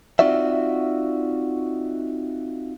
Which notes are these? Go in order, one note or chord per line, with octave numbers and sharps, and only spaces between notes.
C4 D#4 F4 F#4 D5 E5